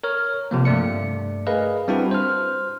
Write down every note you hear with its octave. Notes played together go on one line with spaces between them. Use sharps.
A#4 C#5 F6
C3 F3 A#3
G2 A3 D5 C#7
G#4 A#4 B4 D#5 F5
G3 C4 D4 E4 F#4 B4
C5 F6